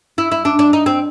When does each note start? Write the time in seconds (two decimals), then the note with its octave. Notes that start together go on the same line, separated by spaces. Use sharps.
0.18 E4
0.32 E4
0.45 D4
0.59 D4
0.73 D#4
0.86 C4